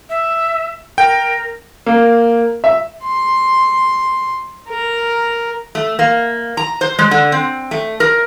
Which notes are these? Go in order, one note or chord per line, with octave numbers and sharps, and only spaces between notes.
E5
A#4 G5
A#3
E5
C6
A#4
A3
A#3
A#5
C5
G#3
D3
C4
A3
A#4